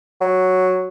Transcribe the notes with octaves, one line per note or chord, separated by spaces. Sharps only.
F#3